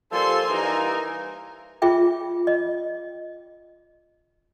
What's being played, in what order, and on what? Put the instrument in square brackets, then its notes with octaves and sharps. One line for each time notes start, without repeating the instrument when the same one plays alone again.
[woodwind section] F3 G3 A4 [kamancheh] A#3 G#5 [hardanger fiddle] C5 C6
[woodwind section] E3 G3 D#4 [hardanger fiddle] A#4
[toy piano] F4 G#4 E5 G5
D#5